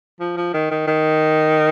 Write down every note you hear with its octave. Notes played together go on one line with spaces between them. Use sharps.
F3
F3
D#3
D#3
D#3